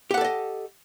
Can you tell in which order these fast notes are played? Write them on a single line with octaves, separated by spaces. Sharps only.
G4 F#5 A4 D5 D#5